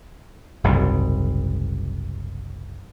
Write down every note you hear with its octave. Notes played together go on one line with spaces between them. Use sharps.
F#1 C2 G#2